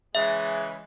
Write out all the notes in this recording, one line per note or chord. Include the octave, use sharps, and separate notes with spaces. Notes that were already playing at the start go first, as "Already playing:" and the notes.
C#3 E3 G#3 E5